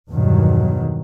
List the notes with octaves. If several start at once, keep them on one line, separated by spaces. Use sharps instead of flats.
E2 G2 B2 D#3 F#3